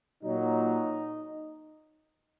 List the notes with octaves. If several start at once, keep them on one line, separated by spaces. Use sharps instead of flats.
A#2 F#3 A#3 D#4